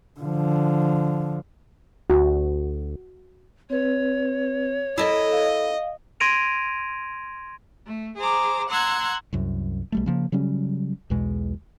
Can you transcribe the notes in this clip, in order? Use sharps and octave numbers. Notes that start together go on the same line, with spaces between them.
D3 F3
D2 F#4
C4 B4 C#5
E4 A4 A#4 D#5
F5
C6 G#6 A#6 D7 D#7 F7
A3
G#4 C5 A#5 D6
F#5 A#5 C6 E6 F#6 G#6
C2 F#2
B1 G3 A3
C#3 F3 A#3
C#3 F#3 G3 C#4
B1 E2 B2 G#3